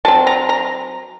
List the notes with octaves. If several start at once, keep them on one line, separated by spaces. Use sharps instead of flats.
F#3 C4 A5
A#5
A#5